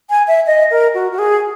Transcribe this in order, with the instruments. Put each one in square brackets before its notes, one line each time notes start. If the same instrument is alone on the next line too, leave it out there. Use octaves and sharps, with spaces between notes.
[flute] G#5
E5
D#5
A#4
F#4
F#4
G#4